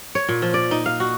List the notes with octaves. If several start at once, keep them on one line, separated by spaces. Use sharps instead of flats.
C#5
A#2
F3
D5
D#4
F5
F#4